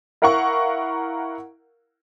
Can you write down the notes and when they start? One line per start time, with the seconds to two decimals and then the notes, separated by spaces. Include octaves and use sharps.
0.22 E4 A#4 F5 F#5 A#5 C#6